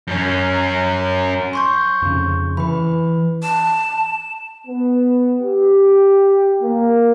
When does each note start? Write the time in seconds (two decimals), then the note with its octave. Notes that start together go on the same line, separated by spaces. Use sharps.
0.07 F#2 C#4
1.53 C6 C#6 G6
2.02 F2 C#3
2.57 E3 B4 B5
3.43 A5 E7
4.67 B3
5.41 G4
6.62 A#3